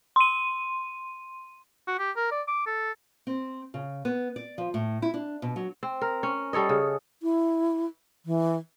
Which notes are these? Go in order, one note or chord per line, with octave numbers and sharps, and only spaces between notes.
C6 D#7
F#4
G4
A#4
D5
D6
A4
C4
C#3
B3
D5
F3
A2
E4
D4
B2
F#3
C4
A#4
C#4
G3 A4 C#5 D#5
C#3
E4
E3